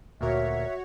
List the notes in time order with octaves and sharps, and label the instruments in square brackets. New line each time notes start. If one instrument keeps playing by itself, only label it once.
[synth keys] D2 A#2 A#4 [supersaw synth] F#4 C#5 [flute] E5